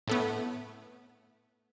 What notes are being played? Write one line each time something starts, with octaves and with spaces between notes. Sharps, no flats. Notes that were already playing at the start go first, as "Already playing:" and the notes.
A2 A3 B3